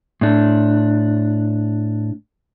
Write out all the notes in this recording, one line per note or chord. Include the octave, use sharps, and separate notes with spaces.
A2 D4